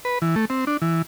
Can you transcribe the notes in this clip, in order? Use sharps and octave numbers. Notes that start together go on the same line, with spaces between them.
B4
E3
A3
C4
D4
E3